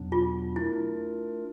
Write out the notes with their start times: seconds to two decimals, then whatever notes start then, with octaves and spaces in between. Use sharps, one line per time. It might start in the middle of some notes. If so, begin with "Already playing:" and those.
Already playing: E2 B2 F#3 B3 D4
0.12 F4
0.56 A3 D4 E4 F4 A#4